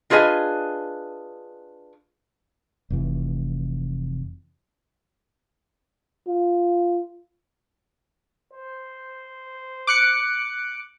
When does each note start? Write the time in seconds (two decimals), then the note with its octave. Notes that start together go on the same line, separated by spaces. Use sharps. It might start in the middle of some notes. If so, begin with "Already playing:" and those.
0.10 D4 F4 G#4 B4 D#5 G#5
2.90 F1 E3
6.28 F4
8.53 C5
9.87 D6 F#6 C#7